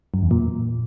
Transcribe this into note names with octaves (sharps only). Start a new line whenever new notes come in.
F#2
E2
A#2